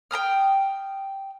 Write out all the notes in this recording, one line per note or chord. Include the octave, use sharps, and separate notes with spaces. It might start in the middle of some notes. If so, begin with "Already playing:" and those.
G5 A#5 D#6 F6